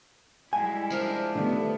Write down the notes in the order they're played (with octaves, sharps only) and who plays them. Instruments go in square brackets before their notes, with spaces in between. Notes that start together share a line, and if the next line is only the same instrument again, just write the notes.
[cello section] G3 G#3 E4 [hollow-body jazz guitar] G#5
[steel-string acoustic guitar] F3 D4 A#4
[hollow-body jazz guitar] D3 D#3 G3 [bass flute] A3 [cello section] B3